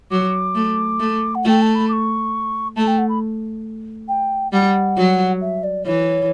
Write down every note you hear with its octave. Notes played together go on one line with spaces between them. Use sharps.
F#3 D6
A3
A3
F#5
A3 G5
A5
B5
D6
C#6
A3 A5
G5
F#5
B5
G5
G3 F#5
F#3
E5
D5
E3 C#5